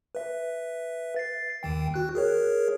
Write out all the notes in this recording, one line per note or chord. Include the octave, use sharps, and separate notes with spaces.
B4 E5
A6 C7
D#2 D#3 G5
F#4 F#6
G#4 A#4 C#5